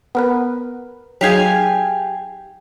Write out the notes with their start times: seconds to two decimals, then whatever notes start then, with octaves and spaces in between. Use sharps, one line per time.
0.15 B3 A#4 B4
1.21 F#3 D#4 G4 G#4 F5 G#5